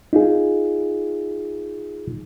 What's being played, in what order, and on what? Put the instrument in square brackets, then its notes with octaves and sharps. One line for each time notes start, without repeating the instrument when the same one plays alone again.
[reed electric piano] D#4 F4 G#4